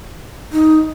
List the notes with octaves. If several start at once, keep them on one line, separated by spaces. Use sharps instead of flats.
D#4